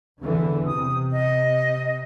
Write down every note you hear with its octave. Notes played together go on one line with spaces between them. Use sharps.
E2 D3 E3
C3 D#6
D#5